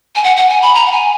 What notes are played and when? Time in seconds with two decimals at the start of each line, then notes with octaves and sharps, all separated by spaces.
0.16 G#5
0.24 F#5
0.37 F#5
0.49 G#5
0.62 B5
0.75 A#5
0.86 F#5
0.92 G#5